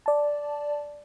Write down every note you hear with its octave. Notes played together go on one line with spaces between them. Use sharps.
D5 A5